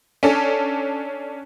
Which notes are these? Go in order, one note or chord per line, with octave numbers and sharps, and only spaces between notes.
C#4 D4 A4